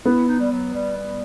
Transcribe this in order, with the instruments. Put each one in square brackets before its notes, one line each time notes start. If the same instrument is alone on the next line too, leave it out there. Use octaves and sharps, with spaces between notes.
[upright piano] B3 [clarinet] E4
[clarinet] D#4
G3
F#3
G3
G3